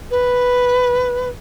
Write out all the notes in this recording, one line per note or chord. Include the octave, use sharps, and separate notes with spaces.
B4